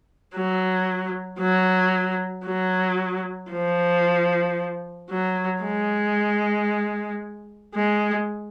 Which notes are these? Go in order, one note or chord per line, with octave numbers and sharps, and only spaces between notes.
F#3
F#3
F#3
F3
F#3
G#3
G#3